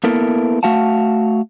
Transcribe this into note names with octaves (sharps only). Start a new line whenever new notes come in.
A#3 B3 E4 A4 A#4
A3 F#4 F5 F#5 A5